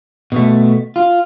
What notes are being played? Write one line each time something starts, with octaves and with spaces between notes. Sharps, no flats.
B2 A3
F4